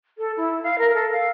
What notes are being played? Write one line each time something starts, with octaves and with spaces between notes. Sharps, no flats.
A4
E4
F5
A#4
A4
F5